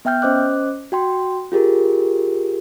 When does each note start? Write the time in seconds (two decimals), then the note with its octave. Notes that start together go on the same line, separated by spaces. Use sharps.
0.05 B3 E5 G5 F6 G6
0.22 C#4 C5 D#5 D6 F#6
0.92 F#4 G5 C6
1.52 F4 G4 G#4 A#4